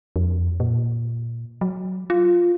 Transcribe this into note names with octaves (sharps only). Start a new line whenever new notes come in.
F2
A#2
F#3
F4